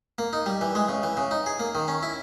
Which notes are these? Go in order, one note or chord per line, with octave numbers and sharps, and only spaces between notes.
A#3
D#4
G3
E3
G#3
C#3
E3
C#3
D#4
G#4
A#3
D#3
C#4
E4